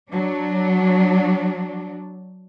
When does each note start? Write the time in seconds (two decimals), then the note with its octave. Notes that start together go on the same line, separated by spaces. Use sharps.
0.10 F#3 D4